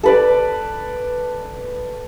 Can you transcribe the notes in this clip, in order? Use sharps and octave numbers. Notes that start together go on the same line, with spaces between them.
A4 B4 D5